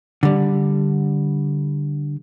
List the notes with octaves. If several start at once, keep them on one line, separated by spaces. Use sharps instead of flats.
D3 G3